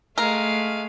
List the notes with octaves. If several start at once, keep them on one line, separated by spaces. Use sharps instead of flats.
G#3 A3 A#4 F5